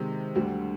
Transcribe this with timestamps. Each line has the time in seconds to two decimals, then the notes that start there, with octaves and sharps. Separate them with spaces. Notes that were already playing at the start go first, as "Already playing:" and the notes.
Already playing: C3 D#3 G#3
0.35 D2 D3 G3